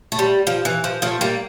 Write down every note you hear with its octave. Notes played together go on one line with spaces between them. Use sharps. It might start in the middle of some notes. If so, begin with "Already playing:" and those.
A3
G3
F3
E3
F3
F3 A3
G3 A#3